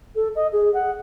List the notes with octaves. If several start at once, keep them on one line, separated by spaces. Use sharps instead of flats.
A4
D#5
G#4
F#5